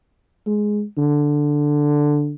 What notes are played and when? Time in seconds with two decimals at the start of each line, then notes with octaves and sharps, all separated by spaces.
0.47 G#3
0.98 D3